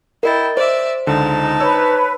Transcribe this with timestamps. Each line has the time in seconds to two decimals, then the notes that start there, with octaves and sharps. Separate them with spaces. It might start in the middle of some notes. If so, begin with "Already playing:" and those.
0.23 E4 A#4 D#5 G5 A6
0.57 C5 D5 E5
1.07 C#2 D3 D#4 A5
1.60 B4 C#5 E6